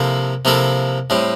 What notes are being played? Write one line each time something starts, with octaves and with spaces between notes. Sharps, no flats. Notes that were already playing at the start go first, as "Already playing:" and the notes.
Already playing: C3 F3 A#3 E4 A4
C3 F3 A#3 E4 A4
A2 G3 C4